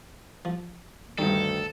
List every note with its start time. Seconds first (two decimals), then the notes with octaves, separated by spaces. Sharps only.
0.45 F3
1.18 D2 G2 D#3 G3 A4